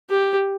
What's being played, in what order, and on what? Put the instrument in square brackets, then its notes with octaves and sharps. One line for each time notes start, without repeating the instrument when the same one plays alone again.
[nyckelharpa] G4